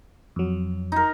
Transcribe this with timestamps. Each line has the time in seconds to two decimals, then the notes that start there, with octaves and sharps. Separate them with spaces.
0.36 F2 F#3
0.92 D#4 A#4